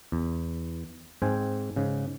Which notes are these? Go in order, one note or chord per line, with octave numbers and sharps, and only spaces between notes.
E2
G#2 C4 G5 G#5
G#2 C#3